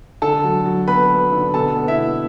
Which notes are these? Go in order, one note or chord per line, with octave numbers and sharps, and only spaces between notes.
D3 A4 A5
F#3
F#3
B3 B4 B5
B3
D3
B2 A4 A5
B3
E4 E5
B3